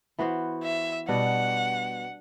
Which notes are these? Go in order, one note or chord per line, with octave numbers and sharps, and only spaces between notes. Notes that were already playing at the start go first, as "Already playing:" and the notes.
E3 B3 F#4 C5
E5
B2 G3 D4 F#4 F#5